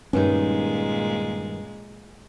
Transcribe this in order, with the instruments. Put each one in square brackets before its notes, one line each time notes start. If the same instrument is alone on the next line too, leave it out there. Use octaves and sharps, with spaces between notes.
[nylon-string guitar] G2 D#3 D#4 [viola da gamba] A#2 G#3 [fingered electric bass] C#4